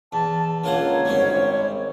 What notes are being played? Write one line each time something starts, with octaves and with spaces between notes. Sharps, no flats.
E2 A5
C#2 D3 A#3 F4 A#4 C#5 F#5
G#1 G3 C4 C#4